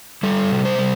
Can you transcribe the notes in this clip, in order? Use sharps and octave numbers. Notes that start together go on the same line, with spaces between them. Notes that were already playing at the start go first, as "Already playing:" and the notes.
G3 A4
C3
C5
G3